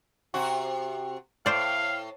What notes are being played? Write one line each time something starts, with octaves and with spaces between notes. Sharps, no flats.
C3 F#4
A2 C5 D5 F5